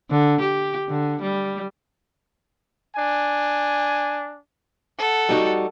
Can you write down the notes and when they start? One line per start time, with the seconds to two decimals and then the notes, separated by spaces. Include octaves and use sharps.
0.11 D3
0.41 G4
0.89 D3
1.22 G3
2.96 D4 G#5
4.98 A4 F#5
5.29 G3 D#4 F#4